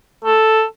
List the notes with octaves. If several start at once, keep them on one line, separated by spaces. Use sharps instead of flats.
A4